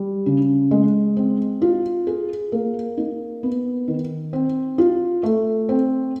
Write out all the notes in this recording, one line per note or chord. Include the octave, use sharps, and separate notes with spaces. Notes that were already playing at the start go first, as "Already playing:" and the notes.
Already playing: G3
C#3
G#3
C4
F4
G#4
A#3
D#4
B3
D#3
C4
F4
A3
C4